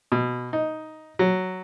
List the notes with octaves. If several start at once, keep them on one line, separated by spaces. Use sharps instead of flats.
B2
D#4
F#3